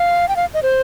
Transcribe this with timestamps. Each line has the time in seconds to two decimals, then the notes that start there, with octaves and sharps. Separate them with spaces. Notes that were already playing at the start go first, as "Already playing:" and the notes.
Already playing: F5
0.29 G5
0.36 F5
0.54 D#5
0.63 C5